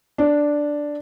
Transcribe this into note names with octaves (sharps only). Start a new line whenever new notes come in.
D4